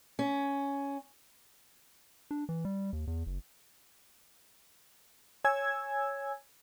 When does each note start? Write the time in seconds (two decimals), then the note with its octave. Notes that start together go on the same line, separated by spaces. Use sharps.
0.19 C#4
2.31 D4
2.49 E3
2.65 G3
2.93 D#2
3.07 E2
3.26 F#1
5.44 C#5 G#5 E6 G#6